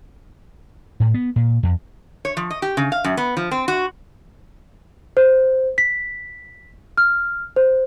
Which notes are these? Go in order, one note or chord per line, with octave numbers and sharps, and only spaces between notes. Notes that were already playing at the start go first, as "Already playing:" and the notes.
A2
B3
A#2
F2
C#5
F3
D#5
G4
C#3
F5
F#2
B3
F3
C4
F#4
C5
B6
F6
C5